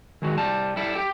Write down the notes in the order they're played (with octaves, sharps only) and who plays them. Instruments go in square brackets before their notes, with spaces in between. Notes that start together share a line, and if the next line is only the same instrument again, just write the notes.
[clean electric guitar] D#3 G#3 F#4
C2 G3 A5
G3 E4 A4
G4 G5